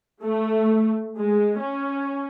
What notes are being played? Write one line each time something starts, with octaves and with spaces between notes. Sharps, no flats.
A3
G#3
C#4